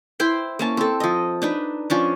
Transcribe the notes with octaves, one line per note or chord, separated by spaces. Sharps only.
E4 C5 G5 C6
A#3 C#4 A5
C4 A4
F3 D#5
D4 D#4 B4
F3 C#4 D4